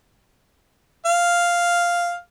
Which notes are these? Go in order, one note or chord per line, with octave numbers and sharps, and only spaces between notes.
F5